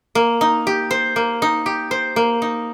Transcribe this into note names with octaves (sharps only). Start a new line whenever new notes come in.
A#3
D#4
G4
C5
A#3
D#4
G4
C5
A#3
D#4